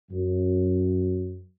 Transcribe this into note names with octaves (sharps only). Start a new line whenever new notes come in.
F#2